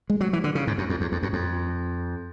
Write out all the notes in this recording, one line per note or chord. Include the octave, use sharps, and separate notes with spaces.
G#3
F#3
E3
D3
C#3
G#2
F#2
F2
E2
F2
F#2
F2